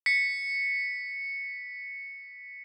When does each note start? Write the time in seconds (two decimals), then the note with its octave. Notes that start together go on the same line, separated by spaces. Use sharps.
0.06 B6 C#7